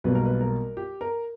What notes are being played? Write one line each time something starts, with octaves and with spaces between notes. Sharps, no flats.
B1 B2 G3 A#3 B4
A#4
B4
A#4
G4
A#4